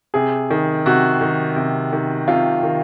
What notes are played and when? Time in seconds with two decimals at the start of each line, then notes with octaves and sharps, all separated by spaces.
0.14 C3 G#4
0.50 D#3
0.86 C3 F#4
1.21 D#3
1.56 C3
1.93 D#3
2.28 C3 F4
2.63 D#3